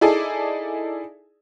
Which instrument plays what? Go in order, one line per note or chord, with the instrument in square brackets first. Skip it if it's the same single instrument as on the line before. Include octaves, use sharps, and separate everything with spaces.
[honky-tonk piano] D#4 E4 G#4 A4 D5 G#5